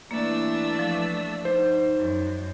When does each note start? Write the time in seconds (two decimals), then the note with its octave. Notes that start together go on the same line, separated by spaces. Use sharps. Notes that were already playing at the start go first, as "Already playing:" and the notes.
0.11 E3 A3 A#3 D4 E6
0.79 F3
1.45 D#4 C5
1.95 F#2